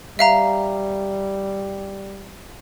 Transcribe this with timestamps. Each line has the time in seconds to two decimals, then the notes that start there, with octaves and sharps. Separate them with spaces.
0.19 G3 E5 F5 A#5